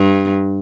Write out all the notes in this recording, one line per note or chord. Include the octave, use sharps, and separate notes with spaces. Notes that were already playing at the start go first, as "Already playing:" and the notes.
Already playing: G2